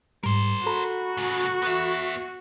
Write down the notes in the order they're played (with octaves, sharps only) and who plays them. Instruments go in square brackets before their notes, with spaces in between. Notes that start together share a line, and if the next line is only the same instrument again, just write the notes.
[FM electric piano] G#2 G3 [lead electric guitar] A#4 C5
[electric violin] F#4 [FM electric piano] A4 A#5 B5
[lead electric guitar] A2 C#3
B3 E5